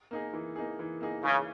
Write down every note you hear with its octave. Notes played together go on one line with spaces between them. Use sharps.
A#3 D#4 G#4
E3
A#3 D#4 G#4
E3
A#3 D#4 G#4
C#3 E3